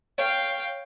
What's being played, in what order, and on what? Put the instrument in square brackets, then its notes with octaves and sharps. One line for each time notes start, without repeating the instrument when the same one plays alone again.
[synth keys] C#5 [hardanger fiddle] F5 G5